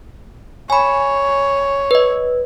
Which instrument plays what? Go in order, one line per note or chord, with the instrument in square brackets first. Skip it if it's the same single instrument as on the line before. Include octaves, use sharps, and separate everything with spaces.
[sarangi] C#5 [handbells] G#5 B5
[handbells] B4 D#5